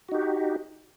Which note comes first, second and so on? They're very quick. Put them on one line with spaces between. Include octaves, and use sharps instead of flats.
F#4 D#4 G4